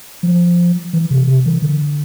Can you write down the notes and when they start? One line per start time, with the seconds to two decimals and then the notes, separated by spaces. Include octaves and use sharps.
0.23 F3
0.93 E3
1.10 C3
1.27 C3
1.46 E3
1.62 D3